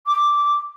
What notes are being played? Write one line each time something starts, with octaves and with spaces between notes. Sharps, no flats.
D6